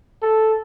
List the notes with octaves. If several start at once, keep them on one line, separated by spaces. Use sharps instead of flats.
A4